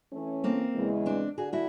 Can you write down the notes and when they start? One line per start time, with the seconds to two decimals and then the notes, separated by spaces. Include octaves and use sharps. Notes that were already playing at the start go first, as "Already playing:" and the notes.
0.13 E3 A3 C#4
0.44 A#3 C4
0.74 E2 C#3 E3 G#3
1.06 C4 D4
1.37 D3 F#4 G#4
1.53 E4 F#4